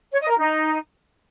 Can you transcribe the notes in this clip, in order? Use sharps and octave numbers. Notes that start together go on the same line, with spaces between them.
C#5
D#5
A#4
D#4